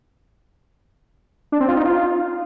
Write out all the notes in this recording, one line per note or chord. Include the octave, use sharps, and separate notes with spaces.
D4
C4
F4
D#4
F4